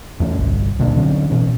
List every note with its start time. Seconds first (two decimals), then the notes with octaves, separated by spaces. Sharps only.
0.20 E2 A3 C#4
0.39 G1 C2
0.79 D1 B2 A#3 D4
0.96 D3 F#3 C4 C#4
1.30 B2 E3 C#4